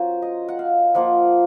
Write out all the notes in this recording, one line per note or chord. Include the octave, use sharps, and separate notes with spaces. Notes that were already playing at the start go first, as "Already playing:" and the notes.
Already playing: F#3 C#4 F4 A#4 C5
D#5
F#5
F5
F3 A#3 F4 F#5